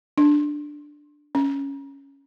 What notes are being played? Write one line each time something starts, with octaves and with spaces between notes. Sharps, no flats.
D4
C#4